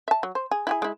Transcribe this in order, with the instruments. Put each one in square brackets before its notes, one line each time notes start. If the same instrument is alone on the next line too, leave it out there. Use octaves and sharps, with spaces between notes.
[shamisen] E5 A5
F#3
C5
G#4
E4 G4 G#4
G#3 E4